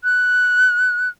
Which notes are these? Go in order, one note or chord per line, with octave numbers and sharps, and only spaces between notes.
F#6